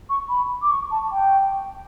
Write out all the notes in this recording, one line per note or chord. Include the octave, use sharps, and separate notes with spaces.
C#6
B5
D6
C#6
A5
G5